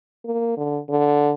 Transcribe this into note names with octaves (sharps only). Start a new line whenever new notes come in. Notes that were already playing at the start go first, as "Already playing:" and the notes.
A#3
D3
D3